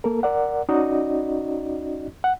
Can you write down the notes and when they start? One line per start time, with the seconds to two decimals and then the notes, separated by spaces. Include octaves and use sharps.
0.04 A#3 A4 A#4
0.23 A#4 D5 F#5
0.69 C#4 D#4 F#4 D5 D#5
2.24 F#5